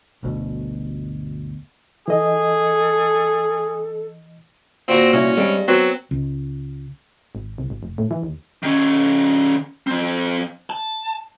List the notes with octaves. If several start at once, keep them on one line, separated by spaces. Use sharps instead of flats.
G1 D2 B2
E3 G#4 A4 D#5
A#2 C4 F#4 A#5
C2 C#4 E4
G2 G3 G#3 C4
F#3 B3 C4
C#2
G#1
C2
G#1
F1
A2
E3
D#2
D#3 C#4
F3 C4
A5